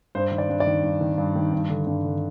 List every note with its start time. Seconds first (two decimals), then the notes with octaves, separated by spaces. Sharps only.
0.15 G2 C5
0.31 D#3
0.38 D5
0.49 G2
0.60 D5
0.67 D#3
0.84 G2
1.01 D#3
1.18 G2
1.36 D#3
1.53 G2
1.69 D3
1.87 G2
2.05 D3